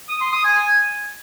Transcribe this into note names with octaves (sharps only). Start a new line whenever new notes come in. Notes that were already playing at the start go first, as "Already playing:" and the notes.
D#6
C6
D#6
G#5